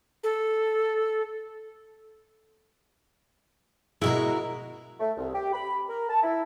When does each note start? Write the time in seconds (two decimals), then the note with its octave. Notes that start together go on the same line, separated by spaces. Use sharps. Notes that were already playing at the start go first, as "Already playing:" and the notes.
0.24 A4
4.02 B2 G#3 E4 F#4 A#4
5.00 A3
5.17 C2
5.34 G4
5.53 B5
5.89 A#4
6.09 A5
6.23 E4